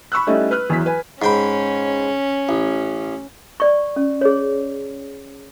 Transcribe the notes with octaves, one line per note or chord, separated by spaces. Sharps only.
B5 C#6 E6 F#6
G3 A3 C#4 D#4 E4
B4 F6 F#6
E2 E3 F#3 E4 B6
B4 G#5
G#2 C#4 G5 B5
A1
D5 C#6
C#4
G#4 C#5